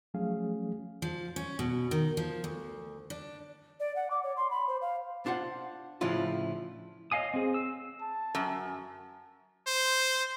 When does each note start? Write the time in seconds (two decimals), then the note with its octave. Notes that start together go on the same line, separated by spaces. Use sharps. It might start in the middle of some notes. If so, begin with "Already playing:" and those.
0.14 F3 F#3 A3 C#4 G#4 F5
1.02 F3
1.36 C#4
1.59 B2
1.91 D#3
2.17 F3
2.44 D2
3.10 D4
3.80 D5
3.96 F#5
4.11 D6
4.23 C#5
4.37 C6
4.51 B5
4.68 C5
4.82 F5
5.26 D4 F4 C5 F#5
6.01 A2 C#3 F3 D4 E4 F4
7.12 C#5 D#5 F5 G#5 D#6
7.34 C4 G#4
7.54 E6
8.01 A5
8.35 F#2
9.67 C5